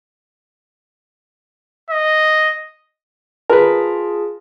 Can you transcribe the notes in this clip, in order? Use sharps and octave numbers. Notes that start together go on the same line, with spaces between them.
D#5
F4 G#4 A#4 B4 A5